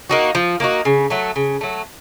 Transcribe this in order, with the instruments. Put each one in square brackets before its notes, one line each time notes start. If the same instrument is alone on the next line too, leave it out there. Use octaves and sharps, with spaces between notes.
[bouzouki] A#3 D#4 F#4
F3
A#3 D#4 F#4
C#3
F#3 A3
C#3
F#3 A3